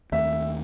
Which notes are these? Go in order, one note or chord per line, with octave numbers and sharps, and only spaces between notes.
D#2 D#3 A3 C4 E5